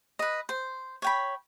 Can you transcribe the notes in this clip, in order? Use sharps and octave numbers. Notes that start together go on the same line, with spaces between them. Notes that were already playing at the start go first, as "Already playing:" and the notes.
B4 D#5
C5
C#5 G5 B5